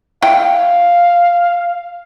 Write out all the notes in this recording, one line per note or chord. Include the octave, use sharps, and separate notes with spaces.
E4 F5 G5